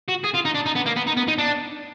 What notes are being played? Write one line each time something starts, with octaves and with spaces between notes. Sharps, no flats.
F#4
G#4
F4
D#4
D4
D#4
B3
A#3
B3
D#4
B3
D#4
D4